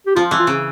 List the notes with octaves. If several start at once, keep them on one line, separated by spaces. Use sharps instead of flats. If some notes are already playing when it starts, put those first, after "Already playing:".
G4
F3 F4
E3
F4
C#3